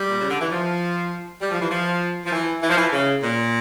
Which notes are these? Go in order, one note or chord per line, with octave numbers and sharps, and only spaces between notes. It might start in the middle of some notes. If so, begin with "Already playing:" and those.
Already playing: G3
A#2
C#3
D3
E3
F3
G3
F3
E3
F3
F3
E3
E3
F3
E3
C#3
A#2